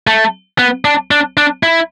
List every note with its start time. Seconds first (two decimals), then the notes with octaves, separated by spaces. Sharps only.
0.07 A3
0.59 B3
0.85 D4
1.11 D4
1.37 D4
1.63 E4